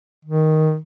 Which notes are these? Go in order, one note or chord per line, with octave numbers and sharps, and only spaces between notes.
D#3